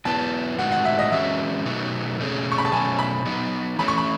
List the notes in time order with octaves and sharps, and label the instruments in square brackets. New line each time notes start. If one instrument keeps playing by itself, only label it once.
[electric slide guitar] F#3 B3 E4 B4 [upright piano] A5
[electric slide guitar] A2 G#3 D#4 F#4 [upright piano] F#5
[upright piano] F#5
E5
D#5
[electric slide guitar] E3 G#3 C#4 F#4 [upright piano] E5
[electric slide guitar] B2 F#3 A3 D#4 F#4
B2 A3 C#4 G#4
[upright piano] C#6
B5
A5
[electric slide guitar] B2 F#3 A3 C#4 [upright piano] G#5
[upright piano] B5
[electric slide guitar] F#3 B3 D#4
[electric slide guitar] E3 A3 C#4 [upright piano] B5
[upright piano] C#6
B5